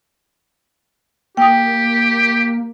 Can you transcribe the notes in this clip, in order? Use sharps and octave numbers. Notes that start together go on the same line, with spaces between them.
A#3 G4 G5 D#6